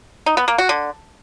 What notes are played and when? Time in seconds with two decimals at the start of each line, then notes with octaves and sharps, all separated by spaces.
0.26 D#4
0.37 B3
0.48 A#3
0.58 F#4
0.69 D3